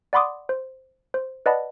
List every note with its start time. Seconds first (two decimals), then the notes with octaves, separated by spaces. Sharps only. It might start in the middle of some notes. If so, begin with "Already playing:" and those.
0.13 D5 F#5 B5 C6 D6 D#6
0.49 C5
1.14 C5
1.46 B4 D5 D#5 F#5 A5 B5